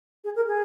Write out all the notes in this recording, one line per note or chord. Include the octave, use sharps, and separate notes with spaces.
G#4
A#4
G#4